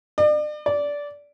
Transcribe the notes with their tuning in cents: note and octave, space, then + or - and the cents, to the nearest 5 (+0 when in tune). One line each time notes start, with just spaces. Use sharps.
D5 +40
D5 -15